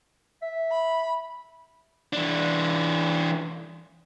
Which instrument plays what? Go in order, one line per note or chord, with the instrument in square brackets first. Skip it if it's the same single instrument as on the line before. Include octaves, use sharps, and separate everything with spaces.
[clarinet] E5
[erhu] B5
[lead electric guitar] E3 D4